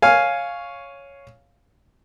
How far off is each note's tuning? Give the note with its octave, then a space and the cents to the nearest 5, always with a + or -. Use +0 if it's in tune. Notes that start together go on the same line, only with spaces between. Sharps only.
C#5 +5 F5 +0 G#5 +0